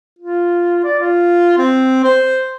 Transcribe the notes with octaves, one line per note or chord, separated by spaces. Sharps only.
F4
D5
F4
C4
C5